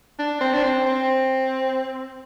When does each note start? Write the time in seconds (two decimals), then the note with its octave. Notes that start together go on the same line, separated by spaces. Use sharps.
0.19 D4
0.41 C4
0.54 D4
0.64 C4
0.86 C4